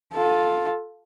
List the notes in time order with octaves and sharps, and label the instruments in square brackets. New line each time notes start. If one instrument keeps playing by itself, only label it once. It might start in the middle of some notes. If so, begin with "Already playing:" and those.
[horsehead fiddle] F4 A4